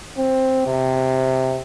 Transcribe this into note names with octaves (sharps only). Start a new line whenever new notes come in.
C4
C3